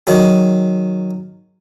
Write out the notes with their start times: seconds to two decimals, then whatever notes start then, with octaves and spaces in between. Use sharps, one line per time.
0.07 D#3 F#3 G#4